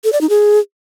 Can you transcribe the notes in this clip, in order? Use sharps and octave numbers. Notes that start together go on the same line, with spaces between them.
A4
D5
D#4
G#4